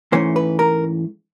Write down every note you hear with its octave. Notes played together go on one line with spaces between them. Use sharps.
G#2 E3 A3 C#4 C5
B4
A#4